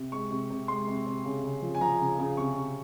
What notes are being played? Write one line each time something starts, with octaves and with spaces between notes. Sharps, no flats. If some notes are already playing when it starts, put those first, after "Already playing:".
Already playing: C3
G#3 C#6
C3
C3
G#3 C6
C3
C3
C#3
C#3
F3
G#5
F3 A#5
C#3
C#3
C3 C#6
C3